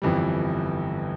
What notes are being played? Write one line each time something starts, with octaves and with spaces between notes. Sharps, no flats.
G1 F2 E3 G3